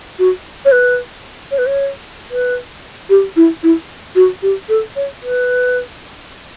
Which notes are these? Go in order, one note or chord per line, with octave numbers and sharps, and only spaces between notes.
F#4
C#5
B4
C#5
B4
C#5
B4
G4
E4
E4
F#4
G4
A4
C#5
B4